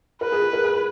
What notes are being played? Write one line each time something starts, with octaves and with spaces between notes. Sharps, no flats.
A#4 B4
G#4
G#4
A#4
G#4